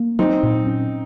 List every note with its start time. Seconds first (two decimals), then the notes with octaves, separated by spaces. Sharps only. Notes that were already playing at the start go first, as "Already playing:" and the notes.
Already playing: A#3
0.19 F#3 C4 D#4
0.43 A#2
0.67 C#4